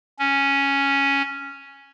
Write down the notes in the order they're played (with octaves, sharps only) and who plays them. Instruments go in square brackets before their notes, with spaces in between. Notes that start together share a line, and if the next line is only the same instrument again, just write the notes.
[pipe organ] C#4